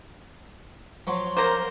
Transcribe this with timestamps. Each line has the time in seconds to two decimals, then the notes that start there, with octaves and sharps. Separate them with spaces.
1.07 F3 F#3 C6 C#6
1.37 A#3 A#4 C5